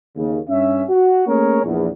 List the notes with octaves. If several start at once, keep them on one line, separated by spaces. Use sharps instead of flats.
D#2 C#3
G2 C#4 E5
F#4
A3 A#3 C#4 G#4 A#4 C#5
A#1 E2